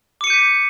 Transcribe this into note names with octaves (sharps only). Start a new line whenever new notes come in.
D6 G6 B6 C#7 D#7